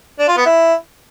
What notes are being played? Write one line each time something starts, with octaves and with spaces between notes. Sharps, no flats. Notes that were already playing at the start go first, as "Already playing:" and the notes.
D4
F4
B3
E4